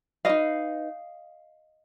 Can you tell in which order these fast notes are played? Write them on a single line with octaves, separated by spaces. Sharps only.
G4 B4 D#5 F5 D#4